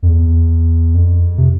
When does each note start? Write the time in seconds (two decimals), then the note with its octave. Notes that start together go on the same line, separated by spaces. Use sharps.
0.03 F2
0.07 E2
0.94 F2
1.38 C3